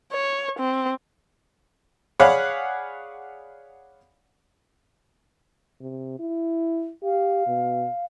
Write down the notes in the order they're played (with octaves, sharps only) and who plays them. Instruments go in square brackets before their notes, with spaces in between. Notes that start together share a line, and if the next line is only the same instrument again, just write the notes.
[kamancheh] C#5
C4
[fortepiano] G#4 C#5 D5 F5 F#5 B5
[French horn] C3
E4
[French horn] G4 [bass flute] F5
[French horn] B2